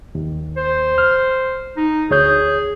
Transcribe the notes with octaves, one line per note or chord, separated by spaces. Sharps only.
D#2
C5
F6
D#4
D2 G#4 C#5 G6